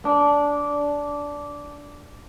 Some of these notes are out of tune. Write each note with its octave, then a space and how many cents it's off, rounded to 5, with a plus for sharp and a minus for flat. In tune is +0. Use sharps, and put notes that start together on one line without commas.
D4 -15